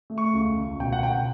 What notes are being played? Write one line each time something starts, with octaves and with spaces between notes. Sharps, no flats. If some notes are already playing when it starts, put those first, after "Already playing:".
A3
C#6
C#2
C#2
B2 G5
F#5
B2 G5